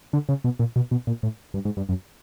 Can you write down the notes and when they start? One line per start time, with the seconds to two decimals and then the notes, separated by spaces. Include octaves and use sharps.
0.13 D3
0.29 C#3
0.44 B2
0.59 A#2
0.76 B2
0.91 B2
1.07 A#2
1.23 A2
1.54 G2
1.65 G#2
1.77 G2
1.89 F#2